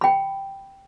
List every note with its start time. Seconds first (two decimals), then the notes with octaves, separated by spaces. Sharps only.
0.01 G5 B5